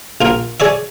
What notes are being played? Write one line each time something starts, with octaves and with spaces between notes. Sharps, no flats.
A#1 F4 A#4
G#4 C#5 D5 E5